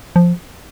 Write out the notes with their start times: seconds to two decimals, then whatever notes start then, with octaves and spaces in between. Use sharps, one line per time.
0.16 F3